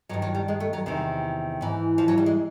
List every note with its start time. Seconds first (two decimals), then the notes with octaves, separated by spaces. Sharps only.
0.09 G2 D#3 F#3
0.22 F#3
0.35 G3
0.48 G#3
0.60 A3
0.73 F#3
0.86 E2 C3 D#3
1.61 G#2 E3
1.98 F3
2.08 F#3
2.18 G3
2.26 G#3